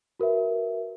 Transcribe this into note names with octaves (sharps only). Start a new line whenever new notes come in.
F#4 A#4 B4 E5